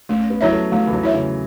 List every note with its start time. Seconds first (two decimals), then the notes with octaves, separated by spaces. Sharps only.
0.09 A3 C#4
0.30 B3
0.41 F#3 E4 C#5 E5
0.51 A3
0.72 F#3 A3
0.87 E3
0.93 F#3
1.03 E4 C#5 E5
1.14 C#3